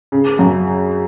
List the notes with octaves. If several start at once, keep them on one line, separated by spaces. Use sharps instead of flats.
C#3
F#2